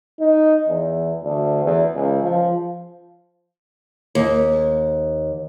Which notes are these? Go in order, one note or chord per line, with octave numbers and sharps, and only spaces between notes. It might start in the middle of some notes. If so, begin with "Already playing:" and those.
D#4
E2
D2
E2
C#2
F3
D#2